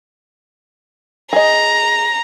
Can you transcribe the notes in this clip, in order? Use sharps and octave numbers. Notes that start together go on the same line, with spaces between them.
G#4 D#5 A#5